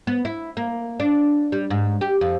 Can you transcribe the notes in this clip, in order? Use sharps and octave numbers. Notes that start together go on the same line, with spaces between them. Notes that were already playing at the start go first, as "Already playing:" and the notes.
B3
E4
A#3
D4
G3
G#2
G4
F2